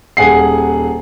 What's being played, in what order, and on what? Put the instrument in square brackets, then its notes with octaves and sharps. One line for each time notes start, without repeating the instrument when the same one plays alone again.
[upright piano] D#1 G#4 F#5 C7